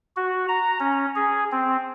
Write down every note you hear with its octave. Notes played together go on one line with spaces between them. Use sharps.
F#4
A#5
C#4
G#4
C4